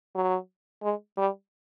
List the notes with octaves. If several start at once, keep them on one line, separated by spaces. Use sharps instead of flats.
F#3
G#3
G3